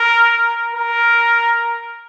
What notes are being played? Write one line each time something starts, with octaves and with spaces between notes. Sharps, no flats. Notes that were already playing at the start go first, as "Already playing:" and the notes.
Already playing: A#4
A#4